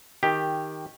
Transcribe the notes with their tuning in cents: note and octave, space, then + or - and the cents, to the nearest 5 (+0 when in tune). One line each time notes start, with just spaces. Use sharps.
D#3 +10 G4 +5